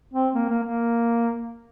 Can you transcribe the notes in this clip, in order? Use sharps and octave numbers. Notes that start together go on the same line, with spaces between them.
C4
A#3
A#3
A#3